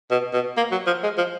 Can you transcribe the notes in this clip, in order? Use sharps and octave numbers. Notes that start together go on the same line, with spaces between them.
B2
B2
A#3
F#3
F3
G#3
F3